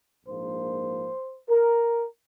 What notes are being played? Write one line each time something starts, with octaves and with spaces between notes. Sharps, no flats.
A#1 G#2 F3 A#3 C5
A#4